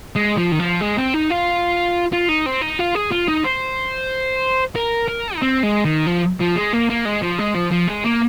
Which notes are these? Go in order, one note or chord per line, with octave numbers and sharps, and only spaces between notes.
G#3
F3
D#3
F3
G#3
C4
D#4
F4
F4
D#4
C4
D#4
F4
G#4
F4
D#4
C5
A#4
A#4
D#4
C4
G#3
D#3
F3
F3
G#3
A#3
A#3
G#3
F3
G#3
F3
F3
G#3
A#3